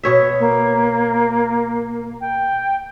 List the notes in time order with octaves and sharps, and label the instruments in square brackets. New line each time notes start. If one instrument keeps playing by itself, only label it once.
[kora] B2 C#5 E5
[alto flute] A#3
G5